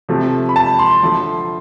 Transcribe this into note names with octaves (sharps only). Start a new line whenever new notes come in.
C3 F3 A3
B5
A5
C6
D3 F3 A3